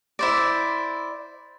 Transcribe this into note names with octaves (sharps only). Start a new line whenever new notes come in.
E4 C5 D5